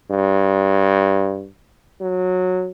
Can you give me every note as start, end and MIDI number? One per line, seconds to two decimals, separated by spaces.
0.11 1.48 43
2.01 2.71 54